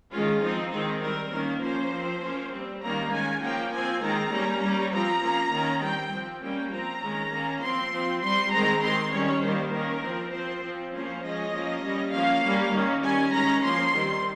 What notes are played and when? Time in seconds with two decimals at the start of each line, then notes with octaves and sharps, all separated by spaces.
0.12 D#3 G#3 C#4 F4
0.42 F3 C4 D#4
0.72 D#3 G#3 C4 D#4
1.03 G3 C4 A#4
1.32 D#3 A#3 C#4 A#4
1.63 F3 A#3 C#4 C5
1.92 F3 C4
2.22 F3 A#3 C#4
2.52 G3 C4
2.82 D#3 G3 A#3 C#4 A#5
3.12 D#3 G#3 C#4 G#5
3.42 F3 A#3 C#4 G5
3.73 F3 C4 G#5
4.03 D#3 G#3 C4 A#5
4.32 G3 A#3 C#4
4.62 G3 C#4
4.92 F3 C4 A#5
5.22 F3 A#3 C#4
5.52 D#3 A#3 C#4
5.82 G3 C4 G5
6.13 F3 C4
6.42 G3 A#3 C#4 G5
6.72 F3 C4 A#5
7.03 D#3 G#3 C#4
7.32 D#3 A#3 C#4
7.62 F3 C4 C6
7.93 F3 C4
8.23 G3 C4 C6
8.52 D#3 G#3 C4 A#5
8.82 D#3 G#3 C4 C6
9.13 D#3 G3 C#4 C#5
9.43 D#3 G3 A#3 C5
9.72 D#3 A#3 C#4 A#4
10.03 F3 C4
10.33 F3 C4 C5
10.63 F3 C4
10.94 F3 A#3 C#4 C5
11.24 F3 G#3 C#4 D#5
11.53 F3 A#3 C#4
11.83 G3 C#4
12.13 F3 A#3 C#4 F5
12.43 G3 A#3 C#4
12.74 D#3 A#3 C#4
13.04 D#3 G3 C#4 G#5
13.33 D#3 G#3 C#4 A#5
13.63 F3 A#3 C#4 C6
13.93 D#3 G3 C4